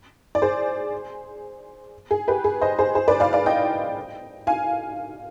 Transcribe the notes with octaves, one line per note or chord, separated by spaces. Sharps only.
D5
G#4 C5
G#4
G4 B4
G#4
C5 D#5
G#4 C5
G#4 C5
B4 D5
D5 F5
D5 F5
D#5 G5
F5 G#5